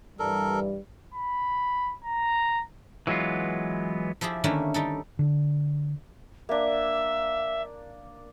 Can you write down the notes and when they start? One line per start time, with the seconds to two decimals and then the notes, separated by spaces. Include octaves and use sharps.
0.19 G2 E3 G3 A4 A#4
1.14 B5
2.04 A#5
3.07 E3 F#3 G#3 B3 F4
4.21 F3 E4 G4 G#4
4.44 D3 D#3 A3 A#3 C#4 E4
4.74 G3 D#4 A4
5.19 D3
6.49 A#3 D4 E5